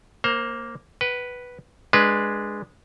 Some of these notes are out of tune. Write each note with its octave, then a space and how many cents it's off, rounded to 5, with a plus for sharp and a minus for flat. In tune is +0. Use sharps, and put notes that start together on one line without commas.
A#3 +0 C5 +20 A#5 +20
B4 -5 F#5 +45
G#3 +0 D4 +15 B4 -15